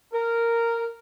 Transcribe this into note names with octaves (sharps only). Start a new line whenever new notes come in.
A#4